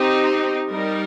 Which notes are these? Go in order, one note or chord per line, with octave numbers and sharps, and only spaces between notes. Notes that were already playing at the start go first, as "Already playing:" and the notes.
Already playing: C4 D#4 G4
G3 D#4 A#4